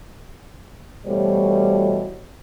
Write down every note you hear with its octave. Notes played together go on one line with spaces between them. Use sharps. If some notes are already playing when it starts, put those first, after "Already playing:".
B2 E3 G3 A3 C5 C#5